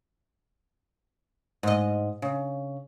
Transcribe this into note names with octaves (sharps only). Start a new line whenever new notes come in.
G#2 D#5
C#3